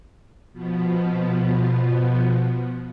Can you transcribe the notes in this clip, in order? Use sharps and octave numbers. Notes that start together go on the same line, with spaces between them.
B2 F3 B3